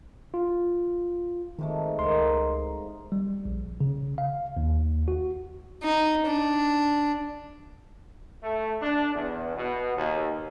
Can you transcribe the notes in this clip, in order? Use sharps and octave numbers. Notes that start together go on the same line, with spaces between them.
F4
G#2 C3 D#3 A3
C#2 A#4 D#5 F5 C6
G3
A#1
C#3
F5
D#2
F#4
D#4
D4
A3
D4
E2
B2
D#2